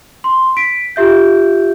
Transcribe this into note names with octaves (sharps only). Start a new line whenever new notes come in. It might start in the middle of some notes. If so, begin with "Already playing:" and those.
C6
B6 D7
F4 G4 E5 G6